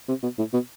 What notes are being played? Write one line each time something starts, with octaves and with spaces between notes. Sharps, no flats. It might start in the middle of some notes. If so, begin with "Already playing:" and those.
C3
B2
A2
B2